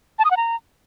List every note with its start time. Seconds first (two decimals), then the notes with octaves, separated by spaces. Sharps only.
0.19 A5
0.25 D#6
0.31 F#5
0.37 A#5